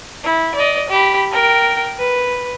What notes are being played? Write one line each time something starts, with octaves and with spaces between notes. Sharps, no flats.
E4
D5 D#5
G4 B5
A#4 G5
B4